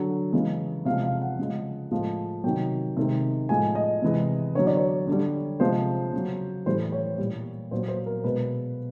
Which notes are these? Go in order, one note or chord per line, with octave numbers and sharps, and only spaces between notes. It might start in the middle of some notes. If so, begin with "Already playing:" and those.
Already playing: D3 F#3
C#3 E3 G#3
C3 F3 G#3 F5
F5
F#5
C#3 F3 G#3
A2 F3 G#3
C3 D#3 F#3 G5
C3 D#3 G#3
A2 F3 G#3 G#5
D#5
C3 E3 G#3
D3 F#3 C#5
D5
C#5
D3 G3
C3 F3 G#3 C5
C#3
F#3
A2 E3 G3 C5
C#5
A#2 G3
A#2 F#3 C5
C5
A#4
B2 G#3 B4